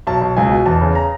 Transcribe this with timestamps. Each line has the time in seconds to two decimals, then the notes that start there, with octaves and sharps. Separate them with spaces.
0.07 B1 A5
0.22 B1
0.37 C#2 G#5
0.51 B2
0.66 E2 A5
0.81 C#3
0.95 A#5